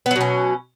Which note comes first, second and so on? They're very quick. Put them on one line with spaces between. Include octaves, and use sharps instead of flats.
B3 F#3 B2 C#4